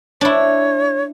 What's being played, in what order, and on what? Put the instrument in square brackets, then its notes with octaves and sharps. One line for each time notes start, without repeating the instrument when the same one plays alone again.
[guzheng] D4 E4 [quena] C#5